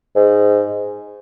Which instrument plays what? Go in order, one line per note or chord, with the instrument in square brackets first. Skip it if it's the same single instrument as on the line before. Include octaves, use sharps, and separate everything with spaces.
[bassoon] G#2